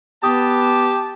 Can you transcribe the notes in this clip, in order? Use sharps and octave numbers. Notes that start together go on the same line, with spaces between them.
B3 G4 A5 D6 D#6